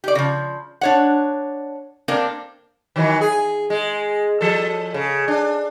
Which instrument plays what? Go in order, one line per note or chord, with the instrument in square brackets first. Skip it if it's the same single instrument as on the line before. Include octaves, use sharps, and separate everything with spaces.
[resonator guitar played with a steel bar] G4 D5
C#3 F3
D4 C#5 F#5
A#3 C4 D4 A#4
[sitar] D#3 E3 F#3
G#4
G#3
F3 A4
C#3
D4